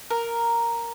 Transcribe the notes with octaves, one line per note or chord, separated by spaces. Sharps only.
A#4